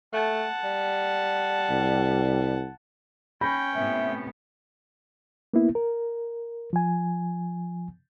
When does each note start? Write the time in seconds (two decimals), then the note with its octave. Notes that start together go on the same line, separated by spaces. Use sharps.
0.13 A3 F#5 A5
0.64 G3
1.70 C2
3.41 C#4 G5 B5 G6 A#6
3.75 A2 C3 B3 E5
5.54 A#3 B3 E4
5.75 A#4
6.73 F3 G#5